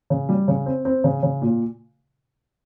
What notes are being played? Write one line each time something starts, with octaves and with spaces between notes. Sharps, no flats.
C#3
G3
C#3
C4
C4
C#3
C#3
A#2